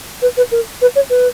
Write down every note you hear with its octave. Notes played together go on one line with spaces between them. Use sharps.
B4
B4
A#4
B4
C#5
B4